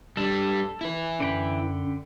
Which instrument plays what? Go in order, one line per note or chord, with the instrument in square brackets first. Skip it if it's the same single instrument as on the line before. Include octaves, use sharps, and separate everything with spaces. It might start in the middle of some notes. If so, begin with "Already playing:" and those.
[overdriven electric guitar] G3 D4 [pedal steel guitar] A4
[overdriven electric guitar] E4 B4
[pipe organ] F#2 [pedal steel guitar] D3 G5 B5